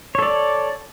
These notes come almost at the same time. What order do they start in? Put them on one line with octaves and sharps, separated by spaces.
C#5 A4 D5